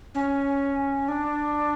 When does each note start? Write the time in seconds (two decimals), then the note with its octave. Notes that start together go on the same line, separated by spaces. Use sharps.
0.15 C#4
1.08 D4